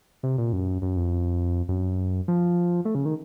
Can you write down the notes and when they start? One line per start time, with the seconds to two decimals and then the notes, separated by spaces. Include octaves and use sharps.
0.23 C3
0.38 A#2
0.53 F#2
0.82 F#2
0.96 F2
1.69 F#2
2.28 F3
2.85 A3
2.95 C#3
3.05 D#3